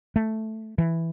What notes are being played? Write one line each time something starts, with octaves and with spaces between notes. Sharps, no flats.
A3
E3